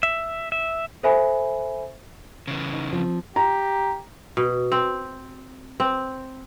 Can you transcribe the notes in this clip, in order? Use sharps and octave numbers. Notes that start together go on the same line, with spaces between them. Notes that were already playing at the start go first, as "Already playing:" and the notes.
E5
E5
A4 C5 E5 G#5 B5
C#3 E3
D#4
F3 C4
G4 A#5
B2
C4
C4